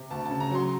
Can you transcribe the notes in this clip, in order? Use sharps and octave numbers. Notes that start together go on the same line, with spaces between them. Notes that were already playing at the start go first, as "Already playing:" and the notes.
Already playing: C3
D2 A5
C#3 A5
A#5
F#3 C6